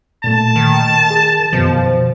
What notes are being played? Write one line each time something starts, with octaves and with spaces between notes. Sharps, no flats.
A#2 A3 A5
D#3
G#4
F#2 B2 D#3 F3